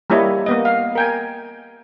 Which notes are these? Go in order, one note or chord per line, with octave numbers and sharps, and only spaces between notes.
G3 A#3 E4 C#5 D#5
A#3 B3 D#5
F5
A#4 G5 G#5